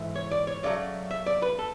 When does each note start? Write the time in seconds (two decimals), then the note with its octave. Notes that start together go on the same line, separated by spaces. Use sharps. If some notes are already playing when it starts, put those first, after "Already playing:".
Already playing: G#2 E3 A3
0.16 C#5
0.31 D5
0.47 C#5
0.63 F#2 C#3 F#3 A3 D5
1.11 E5
1.26 D5
1.42 B4
1.59 A4